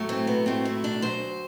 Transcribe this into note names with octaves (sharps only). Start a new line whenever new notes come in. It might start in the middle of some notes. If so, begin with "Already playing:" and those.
Already playing: A2 F#3 A3
C4
B3
A2 F#3 A3 C4
E4
D4
D2 C3 F#3 C5